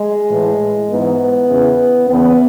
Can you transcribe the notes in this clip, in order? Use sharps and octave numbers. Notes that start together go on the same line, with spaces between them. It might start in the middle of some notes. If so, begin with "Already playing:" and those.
Already playing: G#3
A2 E3
G#2 E3 B3
E2 C#3 E3
E2 C#3 E3 B3